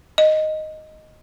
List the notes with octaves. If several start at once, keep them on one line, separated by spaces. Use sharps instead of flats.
D#5